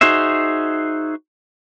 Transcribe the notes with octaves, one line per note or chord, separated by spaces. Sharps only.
D#4 F#4 G#4 C5 E5